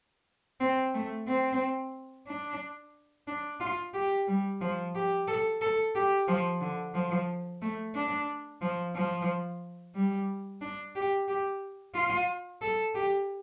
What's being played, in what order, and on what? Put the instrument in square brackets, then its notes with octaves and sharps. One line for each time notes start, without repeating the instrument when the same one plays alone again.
[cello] C4
A3
C4
D4
D4
F4
G4
G3
F3
G4
A4
A4
G4
F3
D3
F3
A3
D4
F3
F3
G3
D4
G4
G4
F4
A4
G4